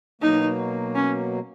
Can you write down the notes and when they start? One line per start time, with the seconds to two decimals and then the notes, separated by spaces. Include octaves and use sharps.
0.21 B2 F#3 A#3 D#4
0.95 C#4